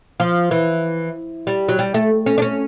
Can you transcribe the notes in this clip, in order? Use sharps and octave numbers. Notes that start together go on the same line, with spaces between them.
F3
E3
G3
F#3
G3
A3
C#4
D4
C#4